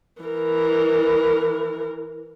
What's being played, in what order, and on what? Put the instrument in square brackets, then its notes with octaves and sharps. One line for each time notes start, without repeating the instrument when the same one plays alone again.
[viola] E3 A#4